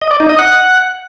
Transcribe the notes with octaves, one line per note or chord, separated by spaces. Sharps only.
D#5
D5
D#4
D#5
F#5